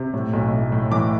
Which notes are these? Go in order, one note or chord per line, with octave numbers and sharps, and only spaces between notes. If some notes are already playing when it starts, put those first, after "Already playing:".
Already playing: C3
A2
B1
A2
A2
E3 D6